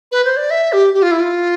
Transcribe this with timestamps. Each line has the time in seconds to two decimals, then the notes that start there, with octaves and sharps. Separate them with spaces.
0.12 B4
0.25 C5
0.37 D5
0.51 E5
0.73 G4
0.94 G4
1.02 F4
1.11 E4
1.20 F4